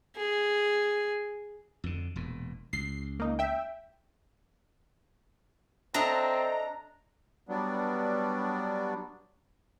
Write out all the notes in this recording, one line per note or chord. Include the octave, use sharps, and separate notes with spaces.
G#4
F2 D3
E1 A#2
C#2 C7
A#3 D#4
E5 G5
C4 D4 A4 D#5 E5 A#5
F#3 G3 B3 D4